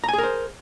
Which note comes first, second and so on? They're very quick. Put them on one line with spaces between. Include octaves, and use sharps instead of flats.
A#5 G#5 G#4 A#4 C5